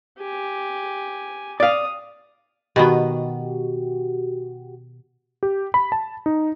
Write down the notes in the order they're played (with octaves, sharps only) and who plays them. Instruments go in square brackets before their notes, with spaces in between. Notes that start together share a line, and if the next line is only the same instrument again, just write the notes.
[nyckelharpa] G4 G#5
[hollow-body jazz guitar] D5 F5 [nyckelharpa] D#6
[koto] B2 D#3 B3 [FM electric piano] F#4 G4
[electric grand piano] G4
B5
A5
D#4